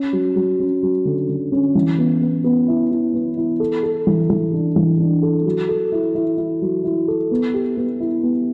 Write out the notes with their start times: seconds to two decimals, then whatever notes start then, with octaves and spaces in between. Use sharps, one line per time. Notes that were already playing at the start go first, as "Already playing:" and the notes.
Already playing: C#4
0.13 F#3
0.36 F#3
0.60 C#4
0.83 F#3
1.05 D3
1.29 D3
1.52 C#4
1.75 E3
1.98 B3
2.22 B3
2.44 B3
2.68 E4
2.91 E4
3.14 B3
3.37 E4
3.60 A4
3.83 A4
4.07 E3
4.30 E3
4.53 D4
4.76 E3
4.99 D4
5.22 A4
5.46 F#3
5.69 A4
5.92 E4
6.15 E4
6.38 E4
6.62 F#3
6.84 E4
7.08 A4
7.31 B3
7.54 G4
7.77 B3
8.00 E4
8.23 B3